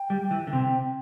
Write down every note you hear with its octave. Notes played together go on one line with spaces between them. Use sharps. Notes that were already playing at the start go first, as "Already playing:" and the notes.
Already playing: G5
G3
E3
D3
C3